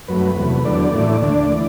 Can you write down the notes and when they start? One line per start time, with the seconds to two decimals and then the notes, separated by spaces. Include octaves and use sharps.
0.08 F#2 F#3 A3 B4
0.37 E2 C3 F#3 A3
0.65 E2 D3 F#3 A3 D5
0.95 A2 E3 A3
1.22 D2 D3 A3 D5
1.51 E3